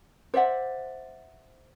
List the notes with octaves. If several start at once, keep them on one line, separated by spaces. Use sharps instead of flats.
C5 D5 E5 F#5